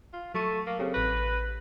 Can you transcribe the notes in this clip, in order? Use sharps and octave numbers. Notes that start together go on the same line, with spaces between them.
F4
F#3 A3 C#6 D#7
A#3
C#3 C4 G4 A4
A1 B4 F#6 A#6